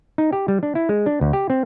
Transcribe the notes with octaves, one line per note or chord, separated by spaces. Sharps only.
D#4
G4
G3
D4
E4
G#3
D4
D2
G4
C4